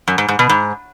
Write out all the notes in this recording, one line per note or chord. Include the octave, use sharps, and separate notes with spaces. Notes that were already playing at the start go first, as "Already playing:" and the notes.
F#2
G#2
G#2
B2
G#2